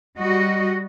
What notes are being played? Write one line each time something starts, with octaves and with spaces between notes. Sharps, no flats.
G3 F#4 D#5